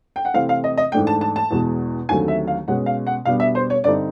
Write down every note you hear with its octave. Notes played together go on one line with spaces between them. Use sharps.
G5
F#5
C3 E3 A3 C4 F5
F5
D#5
D#5
G#2 E3 A3 D4 G5
A5
A5
A5
E2 B2 G#3
D#2 D3 F#3 A3 C4 G#5
E5
F5
B2 G#3 C#4 F#5
F5
F#5
B2 G3 B3 D4 F5
E5
C5
C#5
G2 D3 G3 C4 D#4 D5